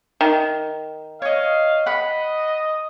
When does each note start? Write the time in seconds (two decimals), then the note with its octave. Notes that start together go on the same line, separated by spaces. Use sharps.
0.21 D#3
1.22 C#5 D#5 F5
1.86 D#5 F#5 B5